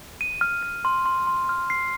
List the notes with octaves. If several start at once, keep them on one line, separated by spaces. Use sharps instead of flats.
D#7
F6
F6
C6
C6
C6
F6
C7